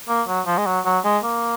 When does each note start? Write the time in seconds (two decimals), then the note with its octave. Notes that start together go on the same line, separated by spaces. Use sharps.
0.09 A#3
0.28 F#3
0.47 F3
0.58 G#3
0.67 F#3
0.85 F#3
1.05 G#3
1.23 A#3